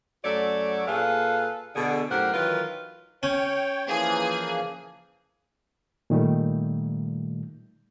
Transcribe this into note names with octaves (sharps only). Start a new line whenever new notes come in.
F#2 A3 F#4 C#5 D5
A#2 G#4 A4 B4 F5
B2 D3 G#4
F#2 A2 G4 A#4 C5 F#5
D#3 E3 F#3 F4 A#4 B4
C#4 C#5 G5
E3 F3 A#3 G#4
A#2 D#3 G3 A3